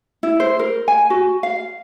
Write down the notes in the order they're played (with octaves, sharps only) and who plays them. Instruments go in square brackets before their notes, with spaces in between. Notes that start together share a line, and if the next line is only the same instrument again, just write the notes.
[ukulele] E4
C5
A#4
G#5
F#4
F5